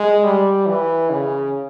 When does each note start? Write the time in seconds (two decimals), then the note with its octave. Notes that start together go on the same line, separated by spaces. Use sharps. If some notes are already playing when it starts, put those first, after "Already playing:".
Already playing: G#3
0.24 G3
0.67 E3
1.10 C#3